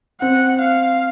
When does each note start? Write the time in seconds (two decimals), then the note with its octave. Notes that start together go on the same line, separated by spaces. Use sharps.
0.21 C4 F#5
0.62 F5